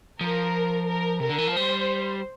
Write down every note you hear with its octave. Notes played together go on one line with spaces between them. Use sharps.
F3 A#4
A#4
C3 A#4
D3
E3
F3
G3 C5